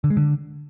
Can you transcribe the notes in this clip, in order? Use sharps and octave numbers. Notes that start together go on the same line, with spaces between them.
D3
G#3
D3